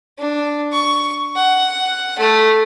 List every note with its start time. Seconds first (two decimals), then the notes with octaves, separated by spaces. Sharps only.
0.19 D4
0.73 C#6
1.36 F#5
2.19 A3